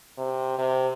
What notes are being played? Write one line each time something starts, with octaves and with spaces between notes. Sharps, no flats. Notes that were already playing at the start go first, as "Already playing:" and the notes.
C3
C3